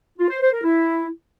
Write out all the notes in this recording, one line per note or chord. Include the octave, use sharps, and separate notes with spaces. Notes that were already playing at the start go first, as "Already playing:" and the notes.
F4
C5
C5
A#4
E4